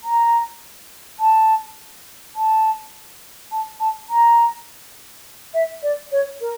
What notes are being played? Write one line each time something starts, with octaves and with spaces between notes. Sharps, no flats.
A#5
A5
A5
A5
A5
A#5
E5
D5
C#5
A#4